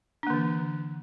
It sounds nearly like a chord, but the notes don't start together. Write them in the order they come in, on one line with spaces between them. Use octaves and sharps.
D4 A#3 D3 E3